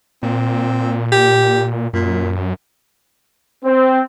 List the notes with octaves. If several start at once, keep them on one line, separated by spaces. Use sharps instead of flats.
A#2 C4
G4
F#2 A#2
C4